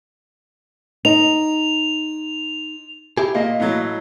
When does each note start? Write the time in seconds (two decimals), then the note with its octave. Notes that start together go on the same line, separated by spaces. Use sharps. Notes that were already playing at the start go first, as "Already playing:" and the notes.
1.05 D#4 F7
3.18 E4 G4 G#4
3.35 A#2 A#3 D#5 F5
3.60 A2 E3 F#3